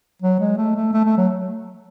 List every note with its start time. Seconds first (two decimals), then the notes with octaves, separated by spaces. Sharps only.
0.22 F#3
0.40 G#3
0.57 A3
0.76 A3
0.93 A3
1.05 A3
1.17 F#3